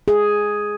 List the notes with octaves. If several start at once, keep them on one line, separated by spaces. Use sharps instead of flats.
G#4